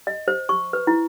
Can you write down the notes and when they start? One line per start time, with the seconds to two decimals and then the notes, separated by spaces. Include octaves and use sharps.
0.07 D#5
0.28 C5
0.49 C#6
0.73 B4
0.87 E4